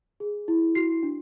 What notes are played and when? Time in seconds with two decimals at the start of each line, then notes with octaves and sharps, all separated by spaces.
0.20 G#4
0.48 E4
0.75 F#4 C7
1.03 D4